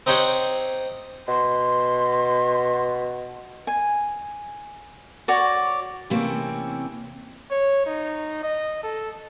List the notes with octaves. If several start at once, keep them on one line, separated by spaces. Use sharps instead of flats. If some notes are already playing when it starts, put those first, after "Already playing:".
C4 D#4 G4 C5 C#5 F#5
B2 C6
G#5
F#4 C#5 D5
C3 E3 A3 A#3 C4 C#4
C#5
D#4
D#5
A4